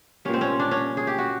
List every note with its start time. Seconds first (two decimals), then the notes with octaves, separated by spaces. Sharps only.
0.25 A#2 G3 C#4
0.33 C4
0.41 C#4
0.59 D4
0.71 C#4
0.97 G#4
1.07 G4
1.18 F#4